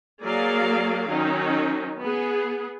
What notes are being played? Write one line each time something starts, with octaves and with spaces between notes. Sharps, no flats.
F#3 A#3 G#4 A#4 D5 F5
D#3 F#3 C#4 D#4
B3 G#4